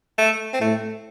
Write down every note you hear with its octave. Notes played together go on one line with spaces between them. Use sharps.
A3
C4
A2 A3